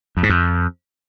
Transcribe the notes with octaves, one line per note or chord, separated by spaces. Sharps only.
F2
G#2
F2